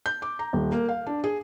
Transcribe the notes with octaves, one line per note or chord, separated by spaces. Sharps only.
G6
D6
A#5
D#1
A#3
F5
D4
G#4